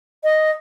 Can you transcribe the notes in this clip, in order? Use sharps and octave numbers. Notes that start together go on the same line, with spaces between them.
D#5